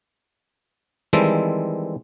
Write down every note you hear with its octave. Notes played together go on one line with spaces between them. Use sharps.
D#3 E3 G3 G#3 C4 A4